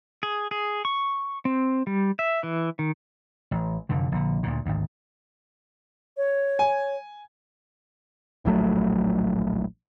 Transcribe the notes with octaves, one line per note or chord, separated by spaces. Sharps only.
G#4
G#4
C#6
C4
G3
E5
E3
D#3
A1
F1 F#2 D3
A#1 D3
D2 A#2
G#1 D2
C#5
G#5
D1 A#1 F#3 A3